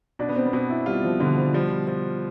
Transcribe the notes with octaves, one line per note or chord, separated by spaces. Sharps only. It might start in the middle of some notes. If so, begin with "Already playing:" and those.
B2 D4
B3
C4
B3
B2 C4
E4
G3 F4
F3
B2 D3
F3
F3 G3
F3